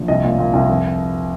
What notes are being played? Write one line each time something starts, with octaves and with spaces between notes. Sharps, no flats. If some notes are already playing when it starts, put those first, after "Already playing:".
Already playing: A#1
C2 D#5
A#2
A#2
C2
F1